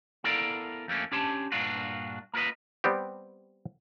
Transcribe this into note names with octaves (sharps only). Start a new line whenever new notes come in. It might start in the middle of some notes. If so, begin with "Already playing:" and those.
B3 E4 A4 A#4 D5 F5
F2 A3 A#3 C#4
C#4 D4 G4 C#5 A5 C6
G2 A#2 D4 F4 F#4
A#3 F4 A#4 B4 D#5
G3 B3 C4 G4